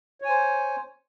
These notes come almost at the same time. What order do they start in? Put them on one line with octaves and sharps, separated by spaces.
C#5 G#5 C5